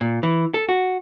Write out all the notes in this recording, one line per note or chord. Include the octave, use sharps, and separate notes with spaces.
A#2
E3
A4
F#4